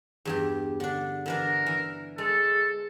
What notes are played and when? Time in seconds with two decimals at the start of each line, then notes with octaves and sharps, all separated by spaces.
0.25 E2 G2 G4
0.80 D3 D4
1.26 D3 E3 D4 A#4
1.66 E3
2.18 G#3 A4